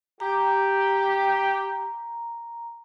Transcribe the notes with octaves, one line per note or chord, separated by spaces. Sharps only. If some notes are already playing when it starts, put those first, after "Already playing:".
G4 A#5